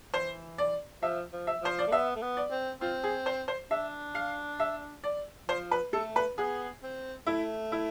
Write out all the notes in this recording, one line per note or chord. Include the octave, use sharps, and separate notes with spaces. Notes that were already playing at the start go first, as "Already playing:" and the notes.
E3 C5
D5
F3 E5
F3
E5
F3 C5
D5
A3
B3 E5
A3
B3
D5
C4
C4 F4
G#4
C5
C5
D4 E5
F5
E5
D5
F3 C5
B4
A3 A4
B4
B3 G#4
C4
A3 E4
E4